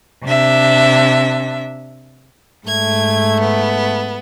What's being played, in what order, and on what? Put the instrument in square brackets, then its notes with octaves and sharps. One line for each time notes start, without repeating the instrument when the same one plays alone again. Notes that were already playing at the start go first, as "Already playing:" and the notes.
[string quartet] C3 D4 E5
[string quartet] G#2 A3 [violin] G#6
[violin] B3